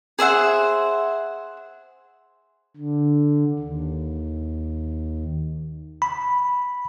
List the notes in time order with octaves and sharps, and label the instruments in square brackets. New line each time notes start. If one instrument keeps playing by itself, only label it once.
[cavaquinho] G#4 C5 E5 F#5
[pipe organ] D3
D#2
[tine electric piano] B5